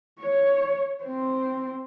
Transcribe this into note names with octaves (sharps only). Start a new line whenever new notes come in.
C#5
C4 C5